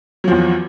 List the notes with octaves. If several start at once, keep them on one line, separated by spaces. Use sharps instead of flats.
E2 F3 F#3